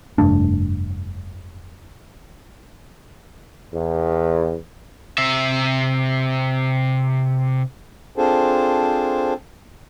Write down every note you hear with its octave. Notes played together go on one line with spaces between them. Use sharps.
F1 G2 A3 D4
E2
C3 E5
C4 D4 F4 G#4 A4 C5